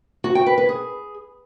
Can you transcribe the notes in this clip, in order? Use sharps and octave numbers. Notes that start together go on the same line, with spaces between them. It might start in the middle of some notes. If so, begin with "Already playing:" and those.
F#4
G5
B4
B4
G#4